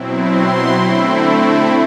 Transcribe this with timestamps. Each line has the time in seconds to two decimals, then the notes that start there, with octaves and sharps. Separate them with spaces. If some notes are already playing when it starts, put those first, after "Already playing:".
Already playing: B2 F#3 C4 E4
0.28 C6
0.76 D3 A3 C4 E4